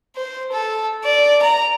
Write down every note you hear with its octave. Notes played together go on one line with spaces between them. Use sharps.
C5
A4
D5
A#5